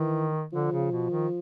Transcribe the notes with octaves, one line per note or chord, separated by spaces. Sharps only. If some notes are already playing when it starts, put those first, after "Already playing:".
Already playing: D#3 E3
D3 F3
C#3
B2
D#3